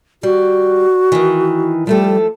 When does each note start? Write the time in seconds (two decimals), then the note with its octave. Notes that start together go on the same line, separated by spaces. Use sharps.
0.23 G3 F#4
1.12 D#3 E3
1.87 F3 G3 A3 A4